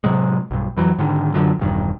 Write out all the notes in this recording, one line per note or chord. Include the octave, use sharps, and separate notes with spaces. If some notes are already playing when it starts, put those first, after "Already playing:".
A2 C3 F#3 G#3
B1 G2
F2 E3 F#3
G#2 D3 D#3
F#2 D3 F3 F#3
E1 G2 D#3